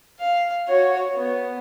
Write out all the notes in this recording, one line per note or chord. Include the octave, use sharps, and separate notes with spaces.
F5
F#4 C#5
B3